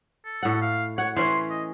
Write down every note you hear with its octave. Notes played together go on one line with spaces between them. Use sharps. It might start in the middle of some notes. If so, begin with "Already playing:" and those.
A4
A2 F#5
F5
C#5 F#5
E3 C#4 E4 C6
D#5